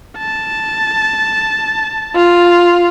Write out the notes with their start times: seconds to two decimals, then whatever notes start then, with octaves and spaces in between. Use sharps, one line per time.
0.18 A5
2.15 F4